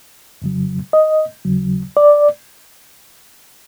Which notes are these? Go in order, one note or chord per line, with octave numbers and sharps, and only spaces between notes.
F2 C#3 F#3
D#5
D#2 C#3 F#3
D5